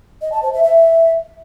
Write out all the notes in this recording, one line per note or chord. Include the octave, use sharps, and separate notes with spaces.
D#5
A5
C5
E5
E5